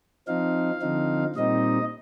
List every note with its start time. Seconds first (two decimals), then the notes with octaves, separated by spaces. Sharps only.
0.27 F3 C4 D#4 F5
0.81 D3 F3 C4 D#4
1.36 A#2 G3 C4 D#4 D#5